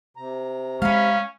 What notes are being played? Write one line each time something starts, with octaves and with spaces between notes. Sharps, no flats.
C3 A#5
G#3 C#4 F5 B5